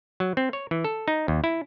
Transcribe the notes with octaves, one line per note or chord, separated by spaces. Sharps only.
F#3
C4
C#5
E3
A4
D#4
D#2
E4